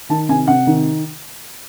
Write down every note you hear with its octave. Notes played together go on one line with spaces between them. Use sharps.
D#3 A5
C3 G#5
C3 F#5
D#3